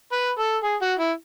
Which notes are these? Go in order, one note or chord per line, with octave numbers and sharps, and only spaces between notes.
B4
A4
G#4
F#4
E4